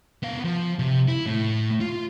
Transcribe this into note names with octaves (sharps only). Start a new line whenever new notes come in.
B3 F5
F3
C3
E4
A2
F4